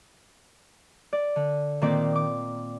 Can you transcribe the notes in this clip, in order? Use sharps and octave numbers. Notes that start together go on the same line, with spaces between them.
D5
D3
A#2 D#3 A#3 C4 D5 D6
D6